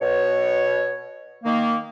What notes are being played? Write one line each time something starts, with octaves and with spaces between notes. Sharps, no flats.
B2 C#5
D#3 A#3